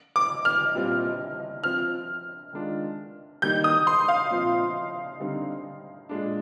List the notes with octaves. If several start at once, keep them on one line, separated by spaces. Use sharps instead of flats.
D6
F6
A#2 G3 C4 F4
F3 C4 F4 F6
D#3 G#3 D4 F4
D#3 G3 A#3 D#4 G6
D#6
C6
F5
A#2 F3 C4 F4
D3 G3 C4 D#4
A#2 G#3 D4